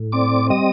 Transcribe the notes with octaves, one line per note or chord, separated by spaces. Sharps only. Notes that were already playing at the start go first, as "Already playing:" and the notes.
Already playing: A2
C4 D5 D6
G3 D#5 D#6